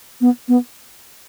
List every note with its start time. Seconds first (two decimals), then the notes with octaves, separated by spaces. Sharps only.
0.21 B3
0.48 B3